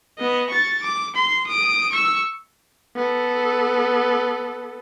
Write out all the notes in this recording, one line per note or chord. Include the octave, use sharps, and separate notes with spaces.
B3 D#5
C#6 A6
D6
C6
D#6 D7
C#6 E6
B3 A4